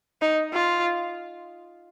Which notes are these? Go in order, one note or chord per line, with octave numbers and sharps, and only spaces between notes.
D#4
F4